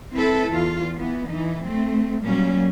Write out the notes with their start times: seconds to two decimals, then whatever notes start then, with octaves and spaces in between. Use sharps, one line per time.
0.14 C4 E4 A4 B4
0.50 E2 F4
0.98 E3 B3
1.28 E3 D#4
1.63 A3 C4
2.23 A#2 F#3 G3 A#3 C#4